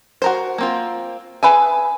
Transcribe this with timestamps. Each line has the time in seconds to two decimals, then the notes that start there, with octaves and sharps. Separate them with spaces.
0.22 F#4 A#4 C5
0.58 A#3 C4 F4
1.43 G#4 B4 E5 G#5